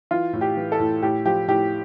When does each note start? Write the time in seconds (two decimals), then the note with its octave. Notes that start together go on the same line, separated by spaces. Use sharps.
0.11 E3 F4
0.33 A2
0.41 G4
0.57 E3
0.72 A4
0.80 A2
1.02 A2 G4
1.25 F3 G4
1.48 A2 G4